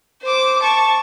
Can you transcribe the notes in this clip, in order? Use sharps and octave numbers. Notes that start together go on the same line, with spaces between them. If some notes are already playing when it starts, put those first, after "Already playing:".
C5 D6
A5 C#6